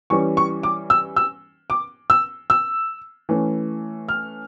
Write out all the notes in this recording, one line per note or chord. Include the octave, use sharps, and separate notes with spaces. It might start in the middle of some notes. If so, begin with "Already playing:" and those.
E3 G3 C#4 C#6
C#6
D6
E6
E6
D6
E6
E6
E3 A3 C#4
F6